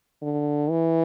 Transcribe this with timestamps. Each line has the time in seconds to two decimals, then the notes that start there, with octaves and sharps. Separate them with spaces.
0.22 D3
0.70 E3